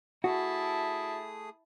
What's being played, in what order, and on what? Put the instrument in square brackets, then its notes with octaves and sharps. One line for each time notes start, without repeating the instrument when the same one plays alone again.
[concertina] A3 G#4 D#6 [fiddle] E4 A5 [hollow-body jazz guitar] F#4